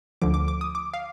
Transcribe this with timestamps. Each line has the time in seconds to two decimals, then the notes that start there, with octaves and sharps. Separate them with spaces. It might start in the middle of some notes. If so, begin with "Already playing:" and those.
0.22 D2 D3 F3 D6
0.34 D6
0.48 D6
0.61 D#6
0.75 D6
0.94 F5